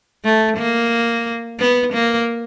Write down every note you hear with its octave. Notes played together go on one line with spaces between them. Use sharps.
A3
A#3
B3
A#3